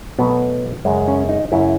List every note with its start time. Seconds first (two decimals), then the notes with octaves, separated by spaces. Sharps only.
0.19 B2 F#3 A3 B3
0.85 F#2 C#3 G#3
1.08 C#4
1.29 D#4
1.52 F#2 C#3 G#3 E4